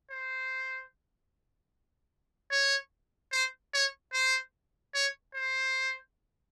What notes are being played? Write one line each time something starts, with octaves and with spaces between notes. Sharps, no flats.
C5
C#5
C5
C#5
C5
C#5
C5